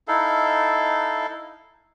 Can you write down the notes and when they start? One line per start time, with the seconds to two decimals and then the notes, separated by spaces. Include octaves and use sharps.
0.08 D#4 E4 A4 F5